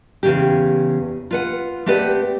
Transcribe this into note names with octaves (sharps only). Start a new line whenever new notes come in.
E2 C#3 G4
F4 B4 F#5
A3 C4 G4 B4 D5 F#5